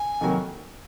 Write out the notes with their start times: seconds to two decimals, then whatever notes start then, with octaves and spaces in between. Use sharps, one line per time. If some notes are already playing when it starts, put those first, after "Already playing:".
Already playing: G#5
0.21 F2 C3 D#3 F#3 A#3